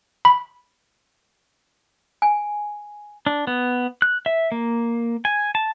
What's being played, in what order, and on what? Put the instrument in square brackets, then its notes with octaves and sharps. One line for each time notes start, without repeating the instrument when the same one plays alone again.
[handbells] B5
[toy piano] G#5
[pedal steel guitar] D4
B3
F#6
E5
A#3
G#5
A5